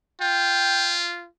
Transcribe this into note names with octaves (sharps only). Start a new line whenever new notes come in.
F4 G5